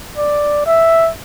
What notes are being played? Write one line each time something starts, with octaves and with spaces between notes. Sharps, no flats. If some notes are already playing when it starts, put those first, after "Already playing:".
D5
E5